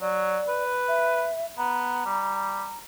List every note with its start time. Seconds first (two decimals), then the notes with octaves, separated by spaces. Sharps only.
0.01 F#3 D5
0.48 B4
0.88 E5
1.58 B3 A#5
2.06 G3